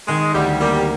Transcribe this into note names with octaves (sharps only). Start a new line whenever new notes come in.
D#3 G#3
D2 G3
G3 A#3